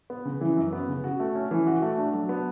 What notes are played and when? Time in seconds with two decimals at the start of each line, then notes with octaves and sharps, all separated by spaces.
0.10 B3
0.25 C#3
0.41 E3
0.57 F#2
0.73 B3
0.88 C#3
1.04 F#4
1.20 A3
1.35 C#4
1.51 E3
1.67 F#4
1.82 A3
1.98 D4
2.14 F#3
2.29 B3